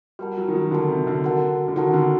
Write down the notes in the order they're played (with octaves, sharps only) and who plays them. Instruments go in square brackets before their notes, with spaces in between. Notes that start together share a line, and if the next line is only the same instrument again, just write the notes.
[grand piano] G3 [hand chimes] F#4 A#4 F#5 A5
[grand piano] F#3
D#3
F#3
[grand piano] D3 [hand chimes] F#4 A#4 F#5 A5
[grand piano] C3
D3
[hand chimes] F#4 A#4 F#5 A5
[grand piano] D3
[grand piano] D#3 [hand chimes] F#4 A#4 F#5 A5
[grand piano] D3